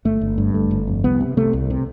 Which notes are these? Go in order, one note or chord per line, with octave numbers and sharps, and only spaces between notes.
G1 A3
G1
G2
G1 A3
G1
F2
C2 B3
C3
C3 A3
C2
C3